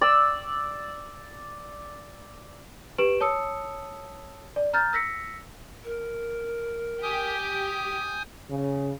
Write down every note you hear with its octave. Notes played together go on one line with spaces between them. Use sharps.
D5 E6
G4 B4 D7 E7 F#7
C#5 A5 D#6 E6 C#7
D5
A#5 F6 G6 A6
E6 A#6 B6 C#7
A#4
G4 G#5 D#6 G6
C#3